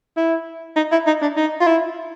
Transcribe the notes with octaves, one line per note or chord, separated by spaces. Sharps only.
E4
D#4
E4
D#4
D4
D#4
F4
E4